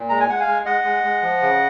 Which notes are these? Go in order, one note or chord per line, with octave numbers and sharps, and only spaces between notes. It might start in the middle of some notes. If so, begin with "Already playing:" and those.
Already playing: A#2
G#3 A#5
G#5
G#3 F#5
F5 G#5
G#3
G#3 D#5 F#5
G#3
G#3
F3
C#3